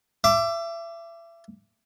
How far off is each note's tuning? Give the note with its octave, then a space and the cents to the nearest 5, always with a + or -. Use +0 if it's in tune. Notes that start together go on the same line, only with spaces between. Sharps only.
E5 +30 D6 +0